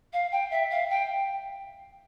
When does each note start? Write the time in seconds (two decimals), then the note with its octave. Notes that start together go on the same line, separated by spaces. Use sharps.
0.12 F5
0.31 G5
0.50 E5
0.70 F5
0.89 G5